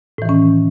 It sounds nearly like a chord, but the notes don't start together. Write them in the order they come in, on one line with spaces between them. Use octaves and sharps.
A2 E3 D#3 C#4